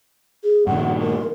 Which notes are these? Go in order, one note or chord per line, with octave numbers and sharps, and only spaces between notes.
G#4
G2 A#2 D#3 F#5
A#4